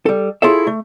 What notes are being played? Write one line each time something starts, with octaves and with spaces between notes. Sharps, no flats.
G3 A4
E4 F4 G#4 A4 C#5 E5
A3